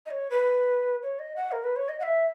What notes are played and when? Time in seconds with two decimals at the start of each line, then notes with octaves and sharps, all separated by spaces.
0.06 D#5
0.11 C#5
0.30 B4
1.03 C#5
1.19 D#5
1.36 F#5
1.52 A#4
1.64 B4
1.76 C#5
1.89 D#5
2.00 F#5
2.03 E5